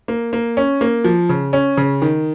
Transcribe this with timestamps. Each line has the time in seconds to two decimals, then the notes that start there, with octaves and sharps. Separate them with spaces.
0.08 A#3
0.33 A#3
0.57 C#4
0.81 A#3
1.04 F3
1.29 C#3
1.53 C#4
1.77 C#3
2.02 D#3